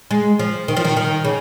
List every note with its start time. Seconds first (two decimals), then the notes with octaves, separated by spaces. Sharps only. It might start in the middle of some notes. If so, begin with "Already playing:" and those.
0.11 G#3
0.39 F3
0.68 D#3
0.77 F3
0.85 D#3
0.97 D#3
1.25 C#3